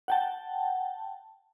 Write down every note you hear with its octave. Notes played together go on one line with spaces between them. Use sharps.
F#5 G5 A5